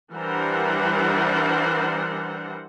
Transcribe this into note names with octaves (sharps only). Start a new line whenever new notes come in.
E3 G3 D4 A#4 C5 F#5